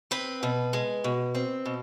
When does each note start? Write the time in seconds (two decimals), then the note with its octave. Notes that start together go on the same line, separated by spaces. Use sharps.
0.11 C4 B4
0.43 B2
0.73 G#3
1.04 B2
1.35 C4
1.65 B2